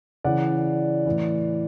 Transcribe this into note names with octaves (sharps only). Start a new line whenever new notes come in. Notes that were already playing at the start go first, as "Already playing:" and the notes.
C#3 E3 D5 F#5
A2 E3